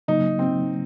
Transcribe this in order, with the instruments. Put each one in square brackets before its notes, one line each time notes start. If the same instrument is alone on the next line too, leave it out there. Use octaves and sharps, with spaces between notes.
[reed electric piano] C#3 F#3 A#3 [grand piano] D#4
[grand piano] C4